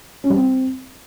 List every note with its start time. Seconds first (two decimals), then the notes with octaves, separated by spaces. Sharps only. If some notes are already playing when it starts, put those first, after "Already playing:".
0.24 C#4
0.30 G3
0.36 C4